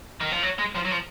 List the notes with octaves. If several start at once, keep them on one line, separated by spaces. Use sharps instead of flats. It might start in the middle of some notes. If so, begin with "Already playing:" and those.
D#3
F3
F#3
G#3
F3
F#3
F3